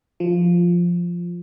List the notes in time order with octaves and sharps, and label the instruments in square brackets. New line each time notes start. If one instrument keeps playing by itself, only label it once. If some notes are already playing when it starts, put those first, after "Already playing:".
[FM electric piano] F3